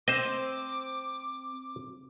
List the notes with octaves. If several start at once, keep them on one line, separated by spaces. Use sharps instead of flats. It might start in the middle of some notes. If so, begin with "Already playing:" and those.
C4 C5 D#5 D6